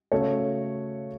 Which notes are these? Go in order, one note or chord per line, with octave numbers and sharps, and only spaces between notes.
C#3 A3 F#4 A4 C#5